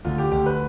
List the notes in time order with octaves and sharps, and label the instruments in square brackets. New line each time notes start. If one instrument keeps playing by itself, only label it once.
[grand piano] D2 [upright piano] F4
[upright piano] G4
[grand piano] D2 [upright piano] G4
[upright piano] B4